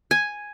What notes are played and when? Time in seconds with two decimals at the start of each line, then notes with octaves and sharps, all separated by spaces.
0.11 G#5